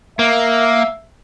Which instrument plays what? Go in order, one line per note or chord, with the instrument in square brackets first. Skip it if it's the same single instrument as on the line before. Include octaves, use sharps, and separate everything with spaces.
[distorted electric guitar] A#3 [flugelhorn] E5